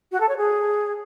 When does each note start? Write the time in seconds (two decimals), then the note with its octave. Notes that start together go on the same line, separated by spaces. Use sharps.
0.12 F#4
0.20 A4
0.29 C#5
0.37 G#4